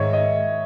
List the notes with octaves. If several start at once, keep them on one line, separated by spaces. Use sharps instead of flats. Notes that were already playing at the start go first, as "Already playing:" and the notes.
Already playing: G#2 D#3 G#3 C#5 D#5 E5
D#5